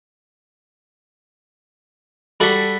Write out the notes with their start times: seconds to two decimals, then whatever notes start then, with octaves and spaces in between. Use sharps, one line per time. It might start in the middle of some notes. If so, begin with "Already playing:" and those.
2.40 G3 F#4 A4 B5 B6